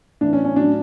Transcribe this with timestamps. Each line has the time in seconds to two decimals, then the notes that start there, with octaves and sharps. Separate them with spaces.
0.21 A2 E3 D4
0.33 C#4
0.45 C#4
0.56 A2 F#3 D4